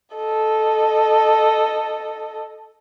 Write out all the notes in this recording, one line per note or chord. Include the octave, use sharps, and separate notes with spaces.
A4 D#5